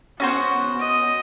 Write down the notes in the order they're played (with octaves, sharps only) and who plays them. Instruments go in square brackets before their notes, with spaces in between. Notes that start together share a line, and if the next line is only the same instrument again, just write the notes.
[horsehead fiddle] B3 [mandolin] C#4 F#4 C5
[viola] D#5